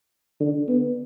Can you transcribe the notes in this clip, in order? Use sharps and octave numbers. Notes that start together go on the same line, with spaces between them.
D3
B3